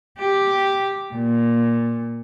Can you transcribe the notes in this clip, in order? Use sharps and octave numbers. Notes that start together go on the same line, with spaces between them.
G4
A#2